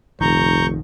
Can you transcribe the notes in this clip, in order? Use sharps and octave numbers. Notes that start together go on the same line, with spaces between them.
F1 A#1 D#3 A#5 C#6 G6